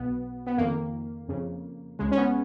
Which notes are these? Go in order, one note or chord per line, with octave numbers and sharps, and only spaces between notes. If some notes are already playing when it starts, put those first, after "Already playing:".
Already playing: B1 B2 B3
B3
F2 D#3 A#3
F2 C#3
C#2 C#3 G#3
C#4
B3